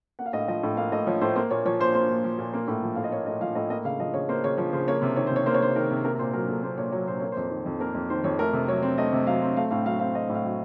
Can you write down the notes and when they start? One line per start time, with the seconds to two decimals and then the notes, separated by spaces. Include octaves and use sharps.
0.19 A#3 F#5
0.26 F5
0.33 A2 D#5
0.40 F5
0.48 F3 D#5
0.63 A2
0.77 A#3 F5
0.92 A2 D#5
1.07 F3 C#5
1.21 A2 C5
1.36 A#3 C5
1.51 A#2 C#5
1.65 F3 C#5
1.80 A#2 C5
1.94 A#3 C5
2.09 A#2
2.24 F3
2.39 A#2
2.53 A#3
2.68 A2
2.82 F3
2.95 A2 F5
3.04 D#5
3.11 A#3 C#5
3.26 A2 D#5
3.41 F3 F5
3.55 A2 D#5
3.70 A#3 D#5
3.85 C#3 F5
4.00 F3 D#5
4.14 C#3 C#5
4.29 A#3 C5
4.44 C#3 C#5
4.58 F3 C#5
4.73 C#3 C5
4.88 A#3 C#5
5.02 C3
5.16 D#3 C#5
5.27 C5
5.32 C3 C#5
5.46 A#3 C5
5.54 C#5
5.61 C3 C5
5.75 D#3 A#4
5.91 C3
6.05 A#3 A#4
6.15 A#4
6.19 A#2 C5
6.33 F#3 A#4
6.48 A#2 A4
6.63 A#3 C5
6.78 A#2 C#5
6.92 F#3 C#5
7.07 A#2 C5
7.20 A#3 C#5
7.32 F2 C5
7.51 D#3
7.66 F2
7.80 A#3 A#4
7.95 F2
8.10 D#3 C5
8.24 F2 C#5
8.39 A3 A#4
8.53 C3
8.68 F#3 C#5
8.83 C4
8.98 A3 D#5
9.13 C3
9.27 F#3 F5
9.42 C4
9.56 A3 F5
9.71 A2 F5
9.86 F#3 F5
10.00 C4 F5
10.15 A3 D#5
10.29 A2
10.35 F5
10.45 F#3